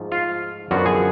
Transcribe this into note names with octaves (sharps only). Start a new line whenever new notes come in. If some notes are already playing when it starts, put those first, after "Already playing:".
Already playing: G#2 F3 A3
F4 F5
F#2 D3 F3 B3 F#4 F#5
G#4 G#5